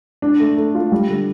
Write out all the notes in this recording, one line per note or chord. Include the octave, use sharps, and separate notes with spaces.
D4
A3
A3
F4
G3
D3